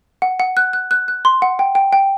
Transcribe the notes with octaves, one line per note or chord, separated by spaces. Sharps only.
F#5
F#5
F#6
F#6
F#6
F#6
C6
F#5
G5
G5
G5